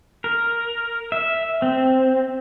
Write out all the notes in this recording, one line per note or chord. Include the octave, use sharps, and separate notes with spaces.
A#4
E5
C4